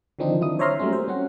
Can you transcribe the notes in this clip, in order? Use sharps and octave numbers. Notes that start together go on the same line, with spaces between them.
D3 D#3 F3 C4 D4 D#4
F#3 E4 D#6
C5 C#5 E5 A#5 C6 F6
F#3 G3 A3 A#3 C#4
C5
C4 C#4 F#5